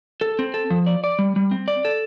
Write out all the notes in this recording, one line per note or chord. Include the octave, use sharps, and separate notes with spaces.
A4
C4
A4
F3
D5
D5
G3
G3
C4
D5
A4